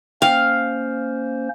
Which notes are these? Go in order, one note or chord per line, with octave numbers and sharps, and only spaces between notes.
A#3 C#4 C5 F5 G5